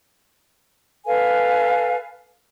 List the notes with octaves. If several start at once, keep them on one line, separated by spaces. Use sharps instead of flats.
A4 B4 F5 G#5